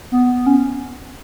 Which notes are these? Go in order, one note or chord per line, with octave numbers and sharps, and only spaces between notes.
B3
C#4